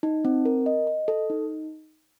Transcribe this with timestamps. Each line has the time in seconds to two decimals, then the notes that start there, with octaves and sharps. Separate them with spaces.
0.03 D#4
0.25 C4
0.45 A#4
0.66 D#5
0.87 D#5
1.08 A4
1.30 D#4